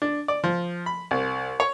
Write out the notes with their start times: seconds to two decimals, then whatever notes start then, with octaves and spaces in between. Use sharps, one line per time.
0.02 D4
0.28 D5
0.44 F3
0.86 B5
1.11 C2
1.60 C#5